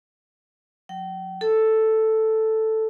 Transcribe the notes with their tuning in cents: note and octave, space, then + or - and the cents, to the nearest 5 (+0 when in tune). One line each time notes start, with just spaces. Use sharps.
F#3 -40 G5 -35
A4 +0 A5 +0